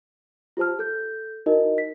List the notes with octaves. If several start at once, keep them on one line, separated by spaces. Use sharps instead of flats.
F4 G4 C5 A5 F6
A4 G6
D#4 E4 F#4 A#4 D#5
B6